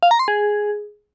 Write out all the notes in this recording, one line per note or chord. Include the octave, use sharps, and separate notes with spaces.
F5
A#5
C6
G#4